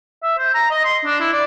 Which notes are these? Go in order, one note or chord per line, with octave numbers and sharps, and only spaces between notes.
E5
C5
A#5
D#5
C6
D4
E4
D5